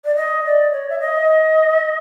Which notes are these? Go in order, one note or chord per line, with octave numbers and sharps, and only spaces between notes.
D5
D#5
D5
C#5
E5
D#5